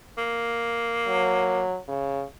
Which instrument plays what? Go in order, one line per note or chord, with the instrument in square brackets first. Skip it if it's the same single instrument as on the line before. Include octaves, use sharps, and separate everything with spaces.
[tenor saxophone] A#3
[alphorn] F#3
C#3